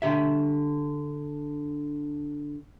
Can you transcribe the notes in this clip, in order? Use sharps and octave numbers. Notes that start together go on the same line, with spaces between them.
D3 G4 E5